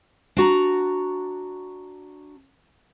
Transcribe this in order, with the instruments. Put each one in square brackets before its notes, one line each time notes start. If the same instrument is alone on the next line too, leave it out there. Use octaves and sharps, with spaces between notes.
[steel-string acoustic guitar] D4 F#4 A#5